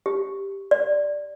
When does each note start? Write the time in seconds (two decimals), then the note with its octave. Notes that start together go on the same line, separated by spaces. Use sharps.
0.06 G4
0.71 D5